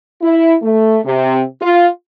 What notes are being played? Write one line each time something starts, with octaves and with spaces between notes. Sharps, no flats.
E4
A3
C3
F4